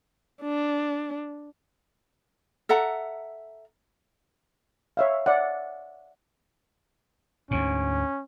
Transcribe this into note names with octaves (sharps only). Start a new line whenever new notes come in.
D4
A4 E5 F#5 A#5
C#5 E5 F5
D5 E5 F#5
D2 G#2 C#4